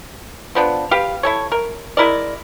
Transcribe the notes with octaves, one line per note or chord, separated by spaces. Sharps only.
F3 B3 D4
G4 B4 F5
E4 A4 C#5
A#4
G#3 E4 A#4 D5